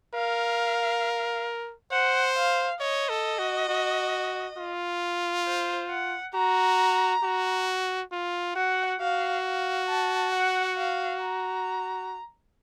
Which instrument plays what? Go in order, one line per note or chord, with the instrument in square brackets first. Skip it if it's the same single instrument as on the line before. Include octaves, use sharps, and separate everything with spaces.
[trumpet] A#4 [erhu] F5
[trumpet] C5 [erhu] F#5
[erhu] F5
[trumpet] C#5 [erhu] D#5
[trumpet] A4
F#4
F#4
F4
[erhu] C5
F#5
[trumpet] F#4 [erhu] A#5
[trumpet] F#4
F4
[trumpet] F#4 [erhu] F#5
[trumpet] F#4 [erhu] F5
[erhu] F5
A5
F#5
F5
A#5